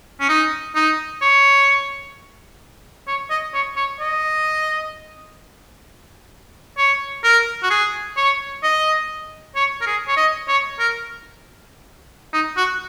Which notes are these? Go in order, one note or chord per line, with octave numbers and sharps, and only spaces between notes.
C#4
D#4
D#4
C#5
C#5
D#5
C#5
C#5
D#5
C#5
A#4
F#4
G#4
C#5
D#5
C#5
A#4
G#4
C#5
D#5
C#5
A#4
D#4
F#4